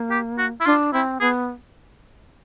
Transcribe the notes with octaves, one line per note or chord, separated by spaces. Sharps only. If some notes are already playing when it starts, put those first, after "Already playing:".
Already playing: A#3
G4
F#4
E4
D4 F4
C4 E4
B3 G#4